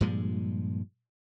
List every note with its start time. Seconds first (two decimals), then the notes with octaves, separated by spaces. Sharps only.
0.01 G2 A#2 F3 G#3